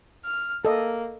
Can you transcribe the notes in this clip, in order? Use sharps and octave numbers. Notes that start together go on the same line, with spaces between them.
F6
A#3 A4 D#5